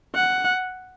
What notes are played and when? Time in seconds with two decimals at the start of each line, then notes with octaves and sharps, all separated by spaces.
0.15 F#5